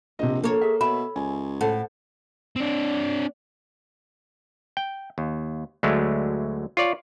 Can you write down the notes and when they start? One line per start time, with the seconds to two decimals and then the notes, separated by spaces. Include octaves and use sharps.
0.19 A#1 C3 C5 D#5
0.44 A#3 A4 C#5
0.61 G#4 E5
0.81 B2 C#5 E5 B5
1.16 C#2 G#5
1.61 A2 A4 C5 F#5
2.56 C4 D4
4.77 G5
5.18 D#2
5.83 D2 D3 F#3 G#3 A3
6.77 F4 C#5 D5